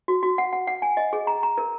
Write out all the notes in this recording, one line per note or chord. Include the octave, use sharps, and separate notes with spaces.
F#4
F#4
F#5
F#5
F#5
G#5
D#5
G#4
A#5
A#5
A#4